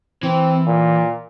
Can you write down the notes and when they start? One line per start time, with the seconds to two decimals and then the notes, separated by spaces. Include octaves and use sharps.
0.23 E3 C4
0.67 A#2